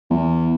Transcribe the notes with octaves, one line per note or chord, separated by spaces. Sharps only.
E2